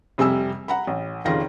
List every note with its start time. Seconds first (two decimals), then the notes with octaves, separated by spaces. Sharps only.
0.18 F2 C3 G3 G#5 E6
0.68 F#5 A#5 B5
0.87 A1
1.25 F1 C#2 D#3 F4 A#6